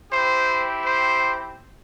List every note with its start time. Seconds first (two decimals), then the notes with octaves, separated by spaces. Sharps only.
0.12 C4 E4 G4 C5
0.84 C5